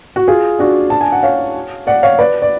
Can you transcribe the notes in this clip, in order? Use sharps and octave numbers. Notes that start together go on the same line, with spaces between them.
F#4
F4 G#4
D4 F#4
A5
G#5
F#5
C#5 F5
D5 F#5
C#5 F5
B4 D5
D5